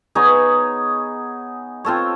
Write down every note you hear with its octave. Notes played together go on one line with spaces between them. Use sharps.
B3 D#4 G#4 C#5
C4 F4 A4 C#5